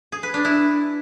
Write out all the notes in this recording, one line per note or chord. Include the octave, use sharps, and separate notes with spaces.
G#4
B4
D4
E4